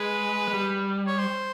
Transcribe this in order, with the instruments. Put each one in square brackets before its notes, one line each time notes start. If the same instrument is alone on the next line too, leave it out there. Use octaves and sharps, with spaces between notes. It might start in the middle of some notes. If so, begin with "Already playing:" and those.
Already playing: [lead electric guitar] G#3 [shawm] B4
[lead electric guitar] G#3
G3
[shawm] C#5
C5